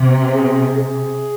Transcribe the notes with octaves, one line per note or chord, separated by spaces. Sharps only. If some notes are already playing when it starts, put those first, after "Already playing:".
Already playing: C3
G#4
G#4